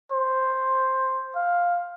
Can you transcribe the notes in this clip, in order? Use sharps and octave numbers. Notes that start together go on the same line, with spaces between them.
C5
F5